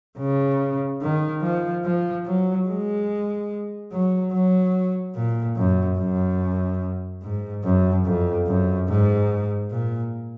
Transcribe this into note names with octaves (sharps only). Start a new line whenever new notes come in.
C#3
D#3
F3
F3
F#3
G#3
F#3
F#3
A#2
F#2
F#2
G#2
F#2
F2
F#2
G#2
A#2